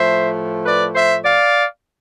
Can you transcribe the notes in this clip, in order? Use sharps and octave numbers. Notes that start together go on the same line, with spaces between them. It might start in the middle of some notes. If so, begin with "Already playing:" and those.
Already playing: A2 F3 A3 C5 E5
B4 D5
C5 E5
D5 F5